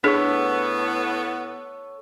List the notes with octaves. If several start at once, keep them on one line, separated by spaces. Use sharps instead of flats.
A2 B3 D4 G#4 A4 C#5 C#6